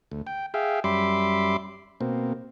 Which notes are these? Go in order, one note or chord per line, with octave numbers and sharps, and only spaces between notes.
D2
G5
G#4 E5 F5 G5
F#2 G3 E5 B5 C6 D6
B2 A#3 C4